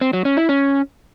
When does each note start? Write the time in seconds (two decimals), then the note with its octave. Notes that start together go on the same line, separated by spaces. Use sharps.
0.01 C4
0.13 F#3
0.25 C#4
0.37 E4
0.49 C#4